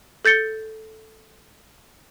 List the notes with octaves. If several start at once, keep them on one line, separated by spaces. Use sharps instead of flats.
A4 G6 A6 C#7 G7